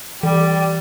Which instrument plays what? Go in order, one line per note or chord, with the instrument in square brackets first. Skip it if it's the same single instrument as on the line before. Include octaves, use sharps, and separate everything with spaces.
[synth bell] E3 [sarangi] G3